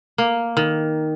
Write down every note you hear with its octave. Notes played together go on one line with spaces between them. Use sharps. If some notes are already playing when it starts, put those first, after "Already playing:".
A#3
D#3